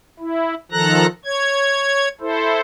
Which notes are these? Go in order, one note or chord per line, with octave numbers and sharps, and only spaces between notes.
E4
D#3 F3 A4 A#5 F#6 A#6
C#5 G#6
E4 A4 C5